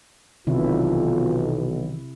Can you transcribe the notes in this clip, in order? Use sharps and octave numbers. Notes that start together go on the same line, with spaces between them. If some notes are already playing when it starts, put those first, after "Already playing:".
B1 C3 D#3 E3 E4 F4